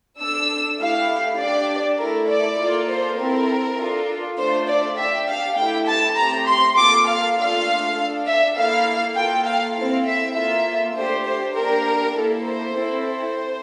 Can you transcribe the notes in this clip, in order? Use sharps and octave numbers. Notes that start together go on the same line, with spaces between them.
D4 A4 E6
A3 E4 G4 F5
D4 G4 D5
A3 E4 A4 A#4
D5
A#3 F4 A4
C5
C4 E4 A4 A#4
D4 F4 A4
A3 D4 F4 C5
D5
D4 G4 E5
F5
A3 E4 G4 G5
A5
A3 C4 G4 A#5
C6
A#3 F4 A4 D6
F5
A3 D4 F4 A4 F5
D4 A4
E5
A#3 E4 A4 F5
A#3 F4 A4 G5
F5
C4 E4 A4 F5
E5
A#3 F4 A4 E5
A3 D4 G4 C5
C5
A#3 D4 G4 A#4
A#3 E4 A4
C5
C4 E4 A4
C5